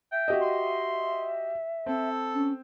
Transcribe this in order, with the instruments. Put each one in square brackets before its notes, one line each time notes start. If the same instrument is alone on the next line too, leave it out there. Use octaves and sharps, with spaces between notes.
[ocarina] E5 [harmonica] G5
[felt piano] F#4 G4 D#5
[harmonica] C6
[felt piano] C4 [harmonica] A4
[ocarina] C#4